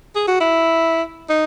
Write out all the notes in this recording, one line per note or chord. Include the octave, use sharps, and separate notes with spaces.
G#4
F#4
E4
D#4